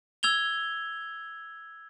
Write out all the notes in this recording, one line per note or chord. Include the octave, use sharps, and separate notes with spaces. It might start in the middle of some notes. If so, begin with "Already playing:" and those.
E6 G#6 F7 G7